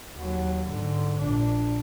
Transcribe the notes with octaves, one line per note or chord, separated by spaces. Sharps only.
D#2 F#3
G#2 D3
A#1 D4